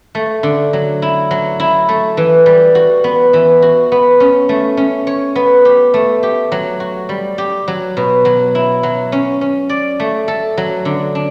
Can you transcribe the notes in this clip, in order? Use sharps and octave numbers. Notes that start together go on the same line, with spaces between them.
A3
D3
F#3
E4
F#3
E4
A3
E3
G3
F#4
B3
E3
F#4
B3
C#4
A3
C#4
C#5
B3
G4
A3
G4
F#3
F#4
G3
G4
F#3
B2
F#3
E4
F#3
C#4
C#4
D5
A3
A4
F#3
D3
D4